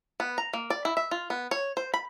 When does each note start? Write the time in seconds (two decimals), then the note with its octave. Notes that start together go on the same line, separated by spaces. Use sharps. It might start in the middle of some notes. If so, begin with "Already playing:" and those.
0.20 B3
0.38 A#5
0.53 A#3
0.70 D5
0.85 E4
0.97 E5
1.11 F4
1.30 B3
1.51 C#5
1.77 C5
1.94 B5